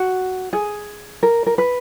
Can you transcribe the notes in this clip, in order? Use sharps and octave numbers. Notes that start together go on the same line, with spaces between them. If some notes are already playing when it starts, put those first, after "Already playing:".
Already playing: F#4
G#4
A#4
A#4
B4